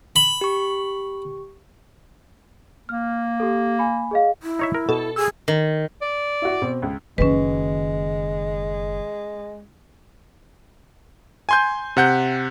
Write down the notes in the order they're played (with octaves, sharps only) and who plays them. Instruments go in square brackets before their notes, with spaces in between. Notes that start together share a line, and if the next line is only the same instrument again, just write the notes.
[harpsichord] B5
[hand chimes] G4 C#6
[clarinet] A#3 [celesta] F6
[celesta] G4 A4
G#5 B5
G#4 D#5 F5
[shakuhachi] E4
[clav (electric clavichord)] D#4 C#5 E5
A#4
[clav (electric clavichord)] B2 [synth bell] A4
[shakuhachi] G#4 [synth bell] E6
[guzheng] D#3
[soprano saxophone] D5
[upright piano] E4 F#4
B2 C4
C#2
[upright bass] F#1 D#3 [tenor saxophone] G#3 [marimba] C#4 B4
[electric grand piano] G#5 C6 G6
C3 F#5 G6